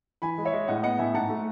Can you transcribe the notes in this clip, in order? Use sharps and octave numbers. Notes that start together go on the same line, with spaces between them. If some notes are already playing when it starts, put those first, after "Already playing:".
E3 G#5 B5
G#3
C#5 E5
G#3
A2 D#5 F#5
B3 D#5 F#5
A2 E5 G#5
G#2 F#5 A5
A3